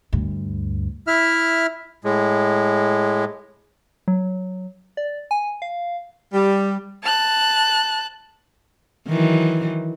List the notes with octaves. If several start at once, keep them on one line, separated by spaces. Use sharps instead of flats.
D2 G2
E4 E5 F6
A2 G#3
F#3
D5
G#5
F5
G3
A5 F#6
D#3 E3 F#3